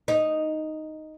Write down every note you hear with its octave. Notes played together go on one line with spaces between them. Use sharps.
D#4